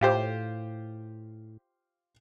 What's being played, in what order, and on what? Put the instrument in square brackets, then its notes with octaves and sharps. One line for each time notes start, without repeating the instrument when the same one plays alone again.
[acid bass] A2 [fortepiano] F4 G4 C5